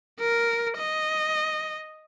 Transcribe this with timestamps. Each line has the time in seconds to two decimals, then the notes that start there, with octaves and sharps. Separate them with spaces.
0.20 A#4
0.78 D#5